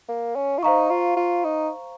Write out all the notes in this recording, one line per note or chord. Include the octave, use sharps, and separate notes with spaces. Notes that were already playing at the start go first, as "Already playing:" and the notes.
A#3
C#4
F4
D#4 C5 F5 A#5 C#6
F4
F4
D#4